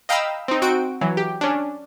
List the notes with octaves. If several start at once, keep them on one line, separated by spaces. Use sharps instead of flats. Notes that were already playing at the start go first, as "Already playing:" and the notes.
D#5 F5 G5 A#5 B5 E6
C4 D#4
C4 F#4 G6 D7
E3 F#3
G4
C#4 D4